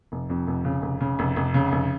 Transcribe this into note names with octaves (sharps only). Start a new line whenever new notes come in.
F1
F2
F1
C#3
F1
C#3
F1
F1
C#3
F1